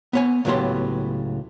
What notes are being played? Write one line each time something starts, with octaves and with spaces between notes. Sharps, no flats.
B3 C#5 G#5
C#2 A2 F#3 B3 G4 C6